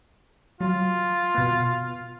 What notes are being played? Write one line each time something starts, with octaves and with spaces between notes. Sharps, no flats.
F#3 F4
B2 B3